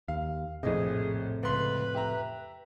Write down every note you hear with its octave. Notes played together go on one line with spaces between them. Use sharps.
D#2 F5
A#1 F2 A2 C3 G#4 D#5
C#2 B4 C6
G4 E5 A#5